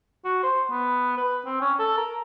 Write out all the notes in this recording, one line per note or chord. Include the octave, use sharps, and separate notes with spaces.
F#4
C5
B3
B4
C4
C#4
A4
A#4